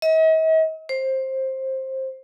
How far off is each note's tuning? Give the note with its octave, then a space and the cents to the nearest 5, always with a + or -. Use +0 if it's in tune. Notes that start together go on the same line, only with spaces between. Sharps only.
D#5 +45
C5 +15